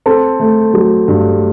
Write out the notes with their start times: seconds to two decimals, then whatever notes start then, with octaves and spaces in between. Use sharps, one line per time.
0.06 C4 A4
0.40 A3
0.74 F#3
1.08 G2